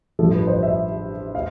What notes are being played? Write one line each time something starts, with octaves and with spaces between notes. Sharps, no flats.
A1 G2 F3 A4
B4
C5
E5
F5